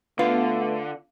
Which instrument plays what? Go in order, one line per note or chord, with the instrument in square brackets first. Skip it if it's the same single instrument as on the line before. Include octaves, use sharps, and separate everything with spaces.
[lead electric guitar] D3 [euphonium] A3 [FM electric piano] B3 [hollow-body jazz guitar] F4